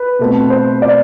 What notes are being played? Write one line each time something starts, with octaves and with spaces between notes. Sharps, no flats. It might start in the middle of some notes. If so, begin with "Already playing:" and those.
Already playing: B4
B2 A3 C4
C5
D5